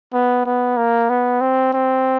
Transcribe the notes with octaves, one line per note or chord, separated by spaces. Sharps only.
B3
B3
A#3
B3
C4
C4